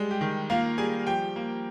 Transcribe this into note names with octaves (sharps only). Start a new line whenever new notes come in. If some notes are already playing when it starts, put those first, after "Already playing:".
Already playing: G3 G#3
G4
D#3
A#3 F4 F5
G3 G#4 G#5
F3 G4 G5
A#3